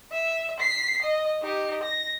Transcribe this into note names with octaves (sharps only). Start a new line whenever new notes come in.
E5
B6 C7
D#5
D#4 G4
A#6